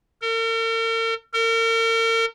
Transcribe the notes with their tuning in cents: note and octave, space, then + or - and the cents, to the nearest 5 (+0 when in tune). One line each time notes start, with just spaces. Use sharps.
A#4 -45
A#4 -40